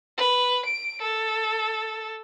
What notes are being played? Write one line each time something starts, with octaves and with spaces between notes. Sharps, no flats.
B4
D7
A4